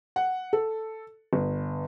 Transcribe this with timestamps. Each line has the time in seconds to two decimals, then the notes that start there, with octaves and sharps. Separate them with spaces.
0.16 F#5
0.53 A4
1.33 G1